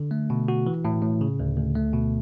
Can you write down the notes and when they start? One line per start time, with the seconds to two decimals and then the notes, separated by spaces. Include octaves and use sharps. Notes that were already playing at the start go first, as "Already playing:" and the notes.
Already playing: D3
0.11 A3
0.30 B2
0.48 F#4
0.67 E3
0.85 A2
1.02 A2
1.21 C#3
1.40 D2
1.57 D2
1.75 A3
1.93 B2